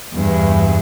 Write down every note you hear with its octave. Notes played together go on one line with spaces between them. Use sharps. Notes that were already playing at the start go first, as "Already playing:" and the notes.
E2 G2